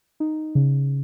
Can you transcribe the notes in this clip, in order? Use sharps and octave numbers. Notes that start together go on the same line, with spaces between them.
D#4
C#3